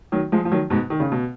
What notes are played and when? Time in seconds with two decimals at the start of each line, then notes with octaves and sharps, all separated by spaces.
0.12 D#3 F#3
0.32 F3 G#3
0.45 F3
0.52 D#3 F#3
0.70 G#2 B2
0.90 D#3
1.00 C#3
1.12 B2